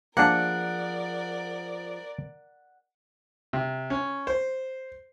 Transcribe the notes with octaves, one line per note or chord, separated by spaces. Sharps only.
F3 A#3 D4 G#4 A#4 D5 F#5
C3
C#4
C5